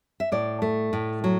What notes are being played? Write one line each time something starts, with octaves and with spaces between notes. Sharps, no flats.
E5
A2 D5
A3
A2
F#3